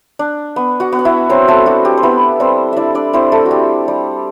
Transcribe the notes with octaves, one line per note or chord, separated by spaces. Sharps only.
D4
B3
F#4 F#5
B3
F#5
E4 E5
F#3 C4 C5
A3 A4
D4 F#4
G4
C5
B3 E4 B4
G3 C4 C5
D4 E4 D5 E5
D4 D5
C4 E4 C5
A3 A4
F#4
G3 G4
G3